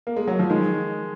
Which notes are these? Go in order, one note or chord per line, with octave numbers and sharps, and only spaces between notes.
A#3
G#3
F#3
F3
D#3 G#3